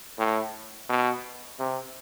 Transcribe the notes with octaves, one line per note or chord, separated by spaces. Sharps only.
A2
B2
C3